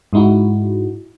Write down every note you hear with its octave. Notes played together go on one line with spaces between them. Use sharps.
G#2 G#3 D#4 E4 F#4